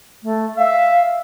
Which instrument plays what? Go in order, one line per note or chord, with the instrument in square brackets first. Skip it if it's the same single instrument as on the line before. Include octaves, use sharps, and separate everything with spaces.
[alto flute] A3
[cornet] E5 [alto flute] F5